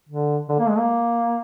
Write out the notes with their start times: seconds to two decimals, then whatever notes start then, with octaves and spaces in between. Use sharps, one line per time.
0.09 D3
0.49 D3
0.59 A#3
0.69 G#3
0.79 A#3